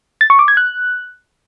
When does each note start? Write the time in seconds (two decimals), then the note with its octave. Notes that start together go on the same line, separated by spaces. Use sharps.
0.21 A6
0.30 C#6
0.39 D6
0.48 G#6
0.57 F#6